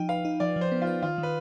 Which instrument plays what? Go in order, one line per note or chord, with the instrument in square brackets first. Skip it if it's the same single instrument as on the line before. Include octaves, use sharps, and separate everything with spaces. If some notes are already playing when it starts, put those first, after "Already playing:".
Already playing: [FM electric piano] F3 D#4 [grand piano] G5
[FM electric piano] B4 [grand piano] F5
[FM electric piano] D#4
[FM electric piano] F3 [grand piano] D5
[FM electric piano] F3
[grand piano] C5
[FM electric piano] B3
[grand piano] F4
[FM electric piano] B4
[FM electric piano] D#3 [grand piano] F4
[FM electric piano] D#3
[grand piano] B4